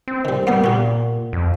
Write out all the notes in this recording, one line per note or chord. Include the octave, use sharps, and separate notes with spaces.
C4
D#3 G3
G3 B3 A#4 F#5 D#6
A#2 F#4 G4
F2